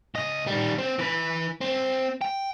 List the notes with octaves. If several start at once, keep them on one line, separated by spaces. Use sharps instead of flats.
C#2 D#5
D#3 G3
C4
E3 B4
C4
G5